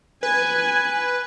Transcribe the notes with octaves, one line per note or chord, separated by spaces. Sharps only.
B4 G#5